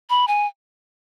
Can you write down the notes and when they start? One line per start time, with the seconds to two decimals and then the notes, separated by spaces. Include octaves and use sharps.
0.10 B5
0.28 G#5